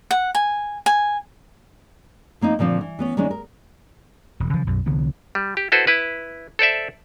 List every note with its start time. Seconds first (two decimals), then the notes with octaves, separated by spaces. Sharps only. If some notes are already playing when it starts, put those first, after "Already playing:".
0.11 F#5
0.35 G#5
0.86 G#5
2.41 F3 A#3 C4 D#4
2.59 A#2 D3 F3 C4
2.81 E3
2.99 E3 B3 C#4
3.17 D#3 G#3 A#3 C#4 D4
3.31 A#4
4.40 E1
4.53 C#3 E3 F3
4.67 B1 F#2 B2
4.86 C2 D3 E3 B3
5.35 G3
5.57 G4
5.72 E4 F#4 A4 B4 C5
5.87 E4 B4
6.59 A4 C5 D5 E5